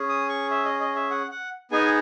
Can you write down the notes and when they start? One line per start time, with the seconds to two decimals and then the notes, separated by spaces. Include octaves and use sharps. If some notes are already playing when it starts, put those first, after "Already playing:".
Already playing: C#4 G#4
0.09 D#6
0.29 C#6
0.50 E5
0.65 D#5
0.80 D#5
0.96 E5
1.11 F#5
1.31 F#5
1.71 B3 D#4 G#4 G#5